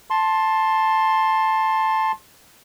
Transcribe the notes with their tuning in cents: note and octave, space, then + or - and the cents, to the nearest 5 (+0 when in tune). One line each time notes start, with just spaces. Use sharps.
A5 +0 C6 +15